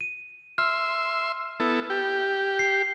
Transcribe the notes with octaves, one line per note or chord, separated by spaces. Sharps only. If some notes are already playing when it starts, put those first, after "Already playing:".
D#7
E5 C6 F6
B3 E4 A4
G4
C7